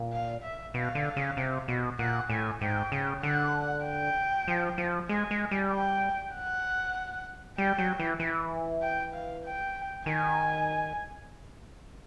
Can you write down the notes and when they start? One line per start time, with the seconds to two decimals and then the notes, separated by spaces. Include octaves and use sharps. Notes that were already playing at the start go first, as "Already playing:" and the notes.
Already playing: A#2
0.12 F5
0.44 E5
0.74 B2 F5
0.95 D3
1.16 C#3
1.37 C3
1.68 B2
1.99 A#2 F#5
2.30 A2 G#5
2.61 G#2 G5
2.92 C#3
3.23 D3 F#5
3.85 G5
4.48 F3
4.78 F3
5.09 G#3 G#5
5.31 G#3
5.51 G3
5.72 G5
6.34 F#5
7.58 G3 G5
7.78 F#3
8.00 E3
8.20 E3
8.82 G5
9.14 F5
9.44 G5
10.06 D#3 G#5